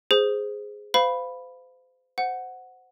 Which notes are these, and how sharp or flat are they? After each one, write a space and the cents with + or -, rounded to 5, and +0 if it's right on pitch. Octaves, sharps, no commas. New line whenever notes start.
G#4 +0 C5 -10
C5 -35 F5 +0 B5 +0
C5 -15 F#5 +0